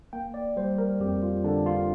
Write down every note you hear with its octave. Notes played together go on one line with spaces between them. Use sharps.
A#3 G5
D5
G3 C5
A#4
F2 G4
F4
D3 D4
F4